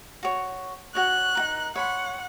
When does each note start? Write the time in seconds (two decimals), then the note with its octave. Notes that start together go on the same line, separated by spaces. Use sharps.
0.23 F#4 C#5
0.95 F#4 C#5 F#6
1.35 D#4 F#4 A#4
1.75 C#5 F#5 B5 C6